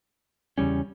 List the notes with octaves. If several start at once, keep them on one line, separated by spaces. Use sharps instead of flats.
E2 C#3 G3 C#4